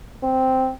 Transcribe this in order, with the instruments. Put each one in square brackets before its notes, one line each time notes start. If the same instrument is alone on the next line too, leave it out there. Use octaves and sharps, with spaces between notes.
[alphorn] C4